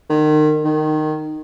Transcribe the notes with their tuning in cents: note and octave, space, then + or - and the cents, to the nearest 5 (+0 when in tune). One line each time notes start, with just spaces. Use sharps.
D#3 -30
D#3 -15